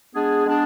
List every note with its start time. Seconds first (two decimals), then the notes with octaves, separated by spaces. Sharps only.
0.15 G#3 B3 D4 G#4
0.46 G#3 B3 D4 G#4